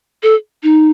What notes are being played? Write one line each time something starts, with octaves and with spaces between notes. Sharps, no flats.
A4
D#4